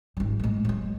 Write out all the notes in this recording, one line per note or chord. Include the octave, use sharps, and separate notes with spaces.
G#1 G3
A2 G#3
F#3 G#3